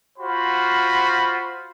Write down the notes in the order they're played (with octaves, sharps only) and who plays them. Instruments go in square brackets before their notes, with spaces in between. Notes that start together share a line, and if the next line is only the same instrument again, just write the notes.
[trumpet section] F4 F#4 C5 B5